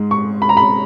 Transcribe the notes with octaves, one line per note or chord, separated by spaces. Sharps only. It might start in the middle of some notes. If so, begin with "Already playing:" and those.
Already playing: G#2 G#3
C#6
B5
A#5
B5